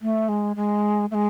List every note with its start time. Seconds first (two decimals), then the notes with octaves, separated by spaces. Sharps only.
0.02 A3
0.29 G#3
0.56 G#3
1.11 A3
1.14 G#3